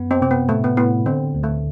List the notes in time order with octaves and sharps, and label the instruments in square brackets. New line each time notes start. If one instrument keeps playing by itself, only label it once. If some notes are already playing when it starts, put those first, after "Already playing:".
Already playing: [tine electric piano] F#2 B3
[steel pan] C4
[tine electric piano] C3 [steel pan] C4
[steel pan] B3
[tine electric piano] A2 [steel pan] A3
[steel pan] B3
[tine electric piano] A2 [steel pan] B3
[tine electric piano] D3 [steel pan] C4
[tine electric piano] D2
[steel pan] A3